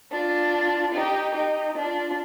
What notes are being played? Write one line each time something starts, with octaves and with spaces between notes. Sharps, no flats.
D4 F4
D#4 G4
D#4 G4
D4 F4